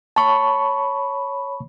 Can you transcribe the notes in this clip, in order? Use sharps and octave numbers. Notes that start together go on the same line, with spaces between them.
C#5 A5 B5 C#6